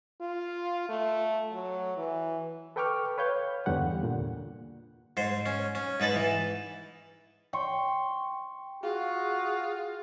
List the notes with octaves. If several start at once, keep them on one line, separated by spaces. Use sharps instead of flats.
F4
A3
F#3
E3
A4 B4 G5 C#6 D6 F6
B4 C#5 F5 G6
E2 G2 D3 G4 F#5
A#2 D3
G#2 C5
C#4
C#4
G#2 D#4 B4 A5 B5
E3
G5 C6 C#6
F4 F#4 G#4